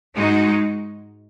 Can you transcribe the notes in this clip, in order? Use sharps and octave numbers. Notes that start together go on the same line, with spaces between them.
G#2 G#3 D#4 F#4